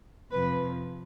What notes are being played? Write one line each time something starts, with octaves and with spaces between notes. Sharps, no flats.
F2 C3 F3 B4